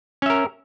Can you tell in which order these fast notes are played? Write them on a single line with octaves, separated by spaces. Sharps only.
C#4 E5 A#4